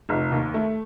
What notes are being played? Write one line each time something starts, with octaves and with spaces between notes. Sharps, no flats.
F1
D#2
A3